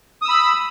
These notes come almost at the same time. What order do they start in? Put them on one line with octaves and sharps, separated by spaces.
D#6 E6 B5